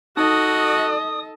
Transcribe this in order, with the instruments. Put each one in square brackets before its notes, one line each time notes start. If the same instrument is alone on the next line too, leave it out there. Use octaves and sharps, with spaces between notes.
[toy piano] D#4 [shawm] F#4 [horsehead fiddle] A4 D#5 [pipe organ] D#6